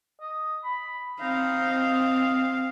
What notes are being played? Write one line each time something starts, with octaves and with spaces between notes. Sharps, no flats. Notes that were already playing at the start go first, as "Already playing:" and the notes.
D#5
B5
C4 D#4 F5
D#5